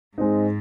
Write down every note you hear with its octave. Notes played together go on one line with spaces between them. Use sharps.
G#2 G#3 C4 D#4